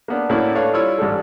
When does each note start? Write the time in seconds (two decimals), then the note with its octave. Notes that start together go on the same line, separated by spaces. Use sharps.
0.08 A#3 B3 D4
0.29 A2 A#3 C#4 D4 E4 F#4
0.55 A3 D4 B4 C#5 F5
0.73 G3 E4 F4 C#5 E6
0.98 A1 G#2 G3 G#3 A4